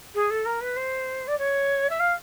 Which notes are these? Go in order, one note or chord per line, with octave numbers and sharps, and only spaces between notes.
G#4
A4
A#4
B4
C5
D5
C#5
E5
F5